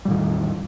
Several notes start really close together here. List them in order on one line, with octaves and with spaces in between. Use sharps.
G3 A2 D#3 E2